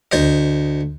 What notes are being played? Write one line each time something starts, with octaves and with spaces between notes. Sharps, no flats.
D2 C5 D#5